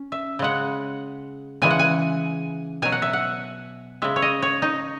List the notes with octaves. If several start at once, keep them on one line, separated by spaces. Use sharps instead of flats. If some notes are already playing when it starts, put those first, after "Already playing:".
Already playing: C#4
E5
C#3 G#3 F#5
C#3 E3 G#3 G#5
F#5
G#5
B2 F#3 G#5
F#5
E5
F#5
C#3 G#3 E5
C#5
D#5
C#5
D#4